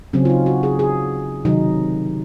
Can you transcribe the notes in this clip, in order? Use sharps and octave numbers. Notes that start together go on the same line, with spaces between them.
C#3 F#3 C4 C#4
F4
D#4
F#4
G#4
G#4
C3 D#3 F#3 D#4